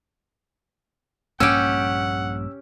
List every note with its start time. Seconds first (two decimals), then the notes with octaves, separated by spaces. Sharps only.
1.40 A#1 G2 A#3 C#4 G4 F#5 E6